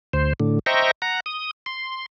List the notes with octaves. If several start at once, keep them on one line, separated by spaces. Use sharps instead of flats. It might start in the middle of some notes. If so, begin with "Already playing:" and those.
D2 C5
A2 D3
C5 D#5 E5 G5 A#5 C#6
F#5 A#5
D#6
C6